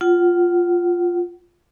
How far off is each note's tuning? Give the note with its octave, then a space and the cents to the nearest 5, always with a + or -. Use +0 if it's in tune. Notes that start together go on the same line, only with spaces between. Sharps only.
F4 +0 F#5 +30